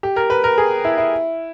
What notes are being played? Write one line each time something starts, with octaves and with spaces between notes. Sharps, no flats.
G4
A#4
B4
A#4
G#4
E4
E4